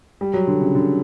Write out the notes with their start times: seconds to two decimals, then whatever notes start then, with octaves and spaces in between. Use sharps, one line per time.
0.21 G3
0.34 F#3
0.47 D3
0.61 C#3
0.75 D3